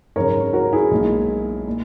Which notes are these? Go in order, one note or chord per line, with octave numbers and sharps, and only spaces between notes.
G#1 F#2 C#3 A#4 C#5
F#4 A#4
E4 G#4
B1 A#2 G#3
A#2